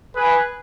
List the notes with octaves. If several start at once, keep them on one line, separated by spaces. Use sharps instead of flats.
G#4 B4